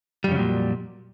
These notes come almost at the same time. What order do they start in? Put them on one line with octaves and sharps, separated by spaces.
G3 F2 C#3 F#3 A#2